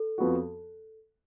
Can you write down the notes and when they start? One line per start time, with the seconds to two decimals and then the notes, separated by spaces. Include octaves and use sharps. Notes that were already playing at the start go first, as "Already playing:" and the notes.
Already playing: A4
0.18 F2 F3 B3 F#4